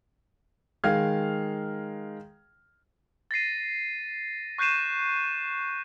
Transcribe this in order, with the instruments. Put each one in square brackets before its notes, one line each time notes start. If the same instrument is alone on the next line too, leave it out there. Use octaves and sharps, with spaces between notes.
[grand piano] D#3 G#3 F5 F6 G#6
[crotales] A6 A#6 C7 D#7
C#6 F#6 G6 C7 D#7 E7